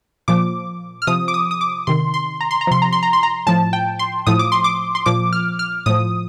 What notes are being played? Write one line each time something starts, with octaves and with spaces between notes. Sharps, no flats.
A#2 F3 D6
F6
C3 F3 D#6
D6
D#6
D#6
D6
C3 D#3 C6
C6
A#5
C6
A#5
C3 F3 C6
A#5
C6
A#5
C6
A#5
A2 F3 A5
G5
C6
A2 F3 D#6
D6
C6
D6
C6
A#2 F3 D6
F6
F6
A2 F3 D#6